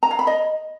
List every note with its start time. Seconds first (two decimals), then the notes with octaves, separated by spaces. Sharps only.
0.03 A#5
0.11 F5
0.19 B5
0.27 D#5